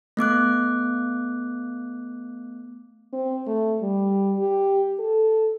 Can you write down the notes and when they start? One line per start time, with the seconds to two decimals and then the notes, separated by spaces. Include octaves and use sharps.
0.17 A3 B3 D6 F#6
3.13 C4
3.47 A3
3.82 G3
4.39 G4
4.99 A4